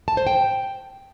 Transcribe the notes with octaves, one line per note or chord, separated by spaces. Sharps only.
A5
C5
G5